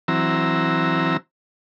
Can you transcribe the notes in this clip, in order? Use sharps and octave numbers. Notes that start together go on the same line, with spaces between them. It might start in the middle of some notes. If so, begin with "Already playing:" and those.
E3 F#3 C4 A#5 E6